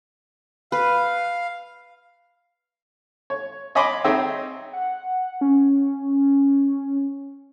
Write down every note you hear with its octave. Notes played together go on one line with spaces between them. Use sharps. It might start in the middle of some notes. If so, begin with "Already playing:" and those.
B4 F5
C#5
C#5 D#5 G#5 B5 C6 D6
C4 D#4 G#4 C#5 E5
F#5
C#4